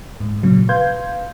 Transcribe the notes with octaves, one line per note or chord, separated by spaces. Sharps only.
G#2
A#2 C#3 F#3
B4 F5 C6 G6 G#6